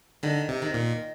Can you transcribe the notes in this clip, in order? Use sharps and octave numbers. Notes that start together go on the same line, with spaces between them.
D3 D#3
C3
D#3
A#2